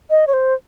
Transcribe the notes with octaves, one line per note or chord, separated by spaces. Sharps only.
D#5
C#5
C5